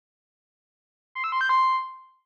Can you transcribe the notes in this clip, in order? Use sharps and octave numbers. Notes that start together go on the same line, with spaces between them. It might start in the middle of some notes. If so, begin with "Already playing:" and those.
C6
E6
C6
G6
C6